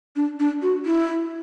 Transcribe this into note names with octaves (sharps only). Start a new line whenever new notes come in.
D4
D4
F#4
E4